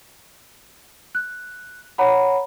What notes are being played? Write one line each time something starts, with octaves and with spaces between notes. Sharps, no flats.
F#6
C#5 F#5 A#5 B5